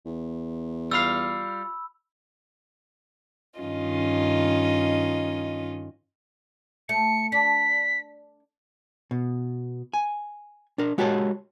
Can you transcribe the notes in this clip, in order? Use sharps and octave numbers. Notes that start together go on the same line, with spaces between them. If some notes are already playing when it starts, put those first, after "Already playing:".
E2
G3 F4 F5 B5 E6
G2 D#3 C#4 F4 D#5
A3 C#7
D4 B6
B2
G#5
D4 A#4
G#3 F#4 G4 A#4 C#5 A5